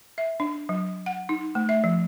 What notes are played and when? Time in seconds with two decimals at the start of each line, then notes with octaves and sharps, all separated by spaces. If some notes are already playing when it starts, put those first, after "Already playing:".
0.18 E5
0.40 D4
0.69 F#3
1.06 F#5
1.29 D#4
1.55 A3
1.69 E5
1.84 F3